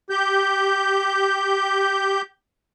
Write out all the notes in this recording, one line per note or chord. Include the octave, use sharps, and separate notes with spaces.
G4 G6